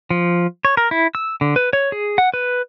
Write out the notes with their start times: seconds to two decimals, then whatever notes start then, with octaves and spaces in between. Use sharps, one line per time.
0.10 F3
0.65 C#5
0.77 A#4
0.91 E4
1.15 E6
1.41 D3
1.56 B4
1.73 C#5
1.92 G#4
2.18 F#5
2.34 B4